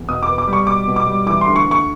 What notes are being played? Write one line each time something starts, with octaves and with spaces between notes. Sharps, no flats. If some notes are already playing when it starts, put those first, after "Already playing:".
Already playing: E2
B2 D#6
D6
B3
D6
G3
C#6
B2 D6
B2
D6
G3
E3 D6
C6
D2
C#6
D2
C#6